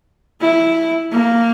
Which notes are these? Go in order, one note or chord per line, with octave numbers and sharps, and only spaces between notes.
E4
A#3